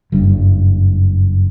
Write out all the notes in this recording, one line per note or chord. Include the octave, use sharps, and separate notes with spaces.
F#1 G2